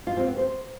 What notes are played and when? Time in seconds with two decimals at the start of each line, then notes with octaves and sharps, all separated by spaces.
0.07 F4
0.17 C4
0.27 B3
0.37 C5